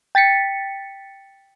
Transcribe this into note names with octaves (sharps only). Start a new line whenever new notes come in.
G5 A6 B6 C#7